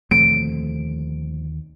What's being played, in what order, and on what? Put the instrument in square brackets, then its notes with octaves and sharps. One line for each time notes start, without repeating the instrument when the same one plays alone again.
[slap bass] D#2 B2 D3 [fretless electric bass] F3 A3 C4 [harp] D7